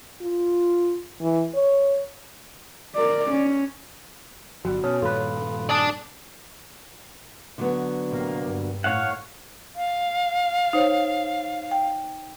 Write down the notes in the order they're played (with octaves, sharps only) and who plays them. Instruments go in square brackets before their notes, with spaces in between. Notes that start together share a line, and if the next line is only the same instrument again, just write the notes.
[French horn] F4
E3
C#5
[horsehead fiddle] A#4 D5
C#4
[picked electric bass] G1 [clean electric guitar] F#3 G3 [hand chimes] F#4
[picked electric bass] B2 [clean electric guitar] C#4 G#4 A4 [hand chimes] C#5
[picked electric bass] G2 A#2 D#3 [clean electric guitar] F4 B4 [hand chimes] A4
[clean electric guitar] G#4 [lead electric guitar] D5 A5
[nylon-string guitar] D3 F#3 B3
[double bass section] A2 C3 A#3
G2
[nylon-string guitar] A2 [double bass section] A3 [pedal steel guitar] C#5 F5 F#5
[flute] F5
[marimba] D#4 C5 C#5
G5